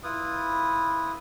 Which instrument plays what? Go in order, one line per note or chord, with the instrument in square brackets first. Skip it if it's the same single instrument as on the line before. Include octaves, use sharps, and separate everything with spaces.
[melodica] E4 F4 B4 D#6